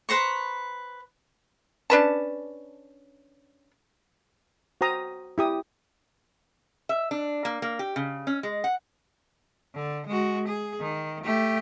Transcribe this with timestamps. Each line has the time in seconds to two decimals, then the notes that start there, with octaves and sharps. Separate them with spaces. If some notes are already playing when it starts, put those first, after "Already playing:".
0.09 B4 C5 A#5 C#6
1.90 C#4 D4 B4 A5
4.81 F#4 C5 G5 A#5 D#6
5.38 E4 G4 D#6
6.89 E5
7.11 D4
7.45 A#3
7.62 A#3
7.79 G4
7.96 C#3
8.27 C#4
8.43 G#3
8.64 F#5
9.75 D3
10.07 G#3 F#4
10.48 G#4
10.81 D#3
11.24 A3 G4